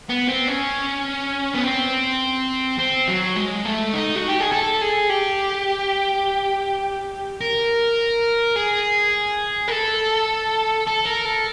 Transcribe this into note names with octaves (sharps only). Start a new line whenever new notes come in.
B3
C4
C#4
B3
C4
C4
F#3
G#3
A3
D#4
F#4
G4
G#4
A4
G#4
G4
A#4
G#4
A#4
A4
A4
A#4
A4